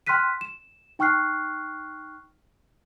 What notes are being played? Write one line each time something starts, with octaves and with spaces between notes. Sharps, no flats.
G5 C6 F6 F#6 B6 D#7
E7
D#4 G5 C#6 F6 F#6 C7